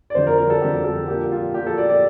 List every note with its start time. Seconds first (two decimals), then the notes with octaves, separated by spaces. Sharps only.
0.10 D5
0.15 F2 D3 G3 C5
0.27 A#4
0.38 A#4
0.50 A4
0.61 F2 D3 G3 G4
0.84 A4
1.08 A#2 F3 A#3 G4
1.32 F4
1.54 A#2 F3 A#3 G4
1.67 A4
1.78 D5
1.89 D5